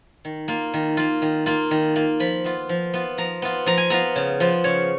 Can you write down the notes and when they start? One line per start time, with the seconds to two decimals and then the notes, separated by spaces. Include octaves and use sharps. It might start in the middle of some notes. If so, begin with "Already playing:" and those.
0.25 D#3
0.48 A#3 F4
0.74 D#3
0.97 A#3 F4
1.22 D#3
1.46 A#3 F4
1.71 D#3
1.96 A#3 F4
2.20 F3 B5
2.44 B3 F4
2.69 F3
2.94 B3 F4
3.18 F3 A#5
3.42 B3 F4
3.66 F3 A#5
3.78 G#5
3.90 B3 F4 A#5
4.16 C#3
4.40 F3 B3 F4
4.64 C#3 C#5